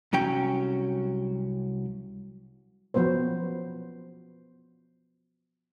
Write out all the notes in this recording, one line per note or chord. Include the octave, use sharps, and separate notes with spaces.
C2 F#3 C#4 G5
F3 F#3 B3 B4 C5